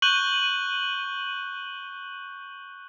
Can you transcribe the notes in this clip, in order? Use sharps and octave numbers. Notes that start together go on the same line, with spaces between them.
C#6 F#6 G6 D#7 F#7 G7